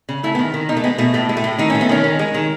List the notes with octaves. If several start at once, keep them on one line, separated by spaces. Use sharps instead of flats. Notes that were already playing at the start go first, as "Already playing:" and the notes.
C#3
A3 E4
B3
D#3
D#3
B2 D#4
A3
G#3 B3
B2 A3
A2 A3
G#3
A3
A2
D#3 D#4
C#4
A3
B3
D#3 C#4
D#3
G#3
D#3